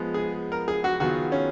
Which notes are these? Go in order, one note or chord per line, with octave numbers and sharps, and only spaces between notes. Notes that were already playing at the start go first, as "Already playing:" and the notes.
Already playing: F3 G#3 B3
G#4
A#4
G#4
F#4
D#3 F#3 B3 F4 F#4 G#4
C#4